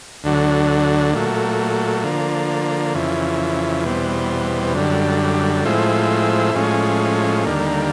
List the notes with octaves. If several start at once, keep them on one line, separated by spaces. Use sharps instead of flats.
D2 D3 F#3
A#2 F#3 A3
D3 F3 A#3
F2 C#3 E3
E2 B2 G3 C4
F#2 D3 G3
A2 F3 G#3 C4 E4
A2 F3 G#3 C#4
D#2 D3 G3 A#3